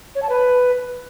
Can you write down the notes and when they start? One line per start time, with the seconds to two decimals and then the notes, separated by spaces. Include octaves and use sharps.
0.15 C#5
0.22 A5
0.29 B4